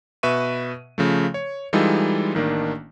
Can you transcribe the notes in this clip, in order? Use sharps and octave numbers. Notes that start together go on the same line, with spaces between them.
B2 B4 E5 C#6 D#7
C#3 F3 A3
C#5
E3 G3 G#3 D#4 F4 A4
A1 D#3 A#3 D4